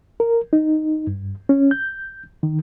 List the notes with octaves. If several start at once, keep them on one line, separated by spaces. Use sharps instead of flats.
A#4
D#4
G2
C#4
G6
D#3